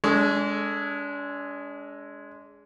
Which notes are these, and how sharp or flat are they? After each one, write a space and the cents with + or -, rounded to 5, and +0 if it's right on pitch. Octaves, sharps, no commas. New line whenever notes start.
G#3 +0 D4 -40 A4 +0